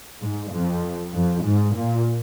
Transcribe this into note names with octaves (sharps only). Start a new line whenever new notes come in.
G#2
F2
F2
G#2
A#2